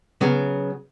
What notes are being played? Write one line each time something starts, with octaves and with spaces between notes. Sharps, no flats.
C#3 F#3 B3